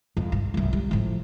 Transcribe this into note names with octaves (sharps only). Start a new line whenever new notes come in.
F2
G2
C2 F#2
G3
A2 F3